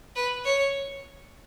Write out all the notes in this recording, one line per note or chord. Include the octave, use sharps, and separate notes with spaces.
B4
C#5